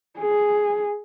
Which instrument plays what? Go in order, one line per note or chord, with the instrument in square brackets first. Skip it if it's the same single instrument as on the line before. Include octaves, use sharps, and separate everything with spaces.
[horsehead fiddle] G#4